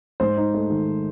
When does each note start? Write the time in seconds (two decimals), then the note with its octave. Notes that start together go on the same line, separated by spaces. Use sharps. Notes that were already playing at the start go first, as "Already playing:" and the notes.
0.20 G#2 C5
0.37 D#4
0.54 A3
0.70 D#3